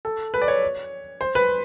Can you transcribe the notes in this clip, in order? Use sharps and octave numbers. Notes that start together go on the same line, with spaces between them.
A4
B4
D5
C#5
C5
B4